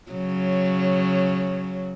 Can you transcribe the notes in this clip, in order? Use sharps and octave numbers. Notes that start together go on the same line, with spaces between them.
C#3 F#3